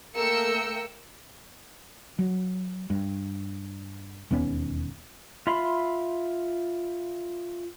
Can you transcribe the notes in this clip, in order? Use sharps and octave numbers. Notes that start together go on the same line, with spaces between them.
A3 A#3 A#4 G5 E6 C#7
F#3
G2
E1 D#2 B3 C#4
F4 E5 B5 C6